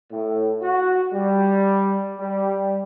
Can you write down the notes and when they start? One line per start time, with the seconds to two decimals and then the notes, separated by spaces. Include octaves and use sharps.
0.11 A2
0.62 F#4
1.13 G3
2.19 G3